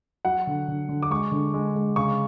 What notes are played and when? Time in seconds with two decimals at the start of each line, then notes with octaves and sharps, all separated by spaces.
0.25 F#3 F#5
0.47 D3
0.68 D3
0.89 D3
1.03 D6
1.10 G#3 C#6
1.32 D3
1.54 G#3
1.76 G#3
1.96 C#3 C#6